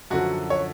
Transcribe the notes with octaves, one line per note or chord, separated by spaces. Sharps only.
F#2 D3 F3 F#4
C#5